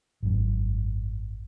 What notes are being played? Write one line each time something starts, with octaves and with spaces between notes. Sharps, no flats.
G#1 F#2